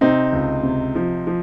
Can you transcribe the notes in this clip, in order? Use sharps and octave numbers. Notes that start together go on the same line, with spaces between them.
C3 C4 D#4
C#2
C3
F3
F3